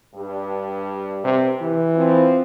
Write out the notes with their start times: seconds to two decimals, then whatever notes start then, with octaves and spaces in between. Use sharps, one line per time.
0.15 G2
1.24 C3
1.61 E3
1.95 F3 C4